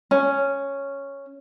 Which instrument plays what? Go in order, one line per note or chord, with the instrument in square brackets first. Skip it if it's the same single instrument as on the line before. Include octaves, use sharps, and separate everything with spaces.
[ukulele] C#4